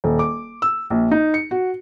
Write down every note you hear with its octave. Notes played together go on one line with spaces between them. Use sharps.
D#1
D6
E6
A#1
D#4
C#7
F#4